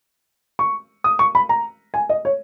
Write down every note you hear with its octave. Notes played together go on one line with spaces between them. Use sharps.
C#6
D#6
C#6
B5
A#5
G#5
D#5
C#5